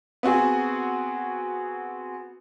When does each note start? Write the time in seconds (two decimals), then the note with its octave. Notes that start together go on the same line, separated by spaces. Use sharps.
0.23 B3 C4 F#4 G#4